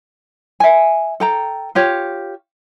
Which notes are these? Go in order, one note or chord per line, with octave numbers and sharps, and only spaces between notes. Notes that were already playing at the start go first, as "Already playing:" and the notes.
E5 G#5
A4 G5 A#5
F4 G4 C#5